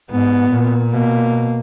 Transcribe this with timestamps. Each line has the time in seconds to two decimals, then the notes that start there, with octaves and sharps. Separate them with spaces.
0.10 G#2 B3
0.51 A#2
0.92 B2 A#3